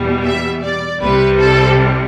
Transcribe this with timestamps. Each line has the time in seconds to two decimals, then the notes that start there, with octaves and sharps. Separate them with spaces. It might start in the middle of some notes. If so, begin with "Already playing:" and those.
Already playing: E2 B2 G3
0.24 E5
0.62 D5
1.01 C2 C3 G3 B4
1.39 A4